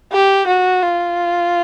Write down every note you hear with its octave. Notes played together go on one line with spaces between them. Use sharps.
G4
F#4
F4